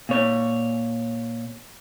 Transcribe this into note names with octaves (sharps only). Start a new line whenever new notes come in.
A#2 C#5